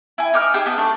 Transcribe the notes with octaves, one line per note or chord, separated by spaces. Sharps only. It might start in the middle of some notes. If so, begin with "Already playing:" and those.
E4 G#5
D#4 D6 F6
D#4 G4 G#4 E6
B3 A5
A3 D4